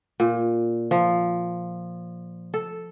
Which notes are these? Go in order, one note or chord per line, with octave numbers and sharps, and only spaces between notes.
A#2
F3
A4